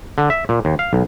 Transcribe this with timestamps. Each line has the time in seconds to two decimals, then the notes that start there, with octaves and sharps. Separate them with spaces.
0.18 D3
0.30 E5
0.49 A#2
0.65 D#2
0.79 F5
0.93 B1